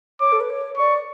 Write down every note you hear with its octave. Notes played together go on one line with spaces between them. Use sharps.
C#5 D6
A4
B4
C#5
D5 C#6